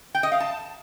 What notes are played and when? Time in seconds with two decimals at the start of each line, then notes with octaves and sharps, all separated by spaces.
0.15 G5
0.23 D#5
0.32 F5
0.40 A5